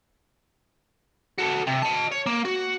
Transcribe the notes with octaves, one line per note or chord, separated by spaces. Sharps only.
F#4 A4
C3
D#5 A5
C#5
A#3
F#4